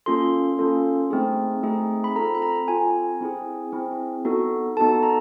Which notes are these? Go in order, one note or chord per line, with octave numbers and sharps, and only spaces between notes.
A#3 C#4 F4 A4 C6
A#3 C#4 F4 A4
A3 C4 D#4 G#4
A3 C4 D#4 G#4
B5
C4 F4 A4 A#5
B5
A#5
C4 F4 A4 G#5
C4 E4 G#4
C4 E4 G#4
B3 D#4 F#4 A4
B3 D#4 F#4 A4 A5
A#5